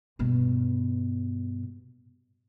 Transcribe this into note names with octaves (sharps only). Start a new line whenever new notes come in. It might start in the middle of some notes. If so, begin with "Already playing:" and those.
G2 B2